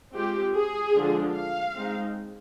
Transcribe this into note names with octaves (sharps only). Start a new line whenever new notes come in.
G#3 C4 F4 G4
G#4
D3 F3 G#3 D4 F4
F5
G#3 C4 D#4